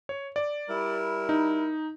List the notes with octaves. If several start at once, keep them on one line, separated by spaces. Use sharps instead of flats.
C#5
D5
G3 E4 A#4
D#4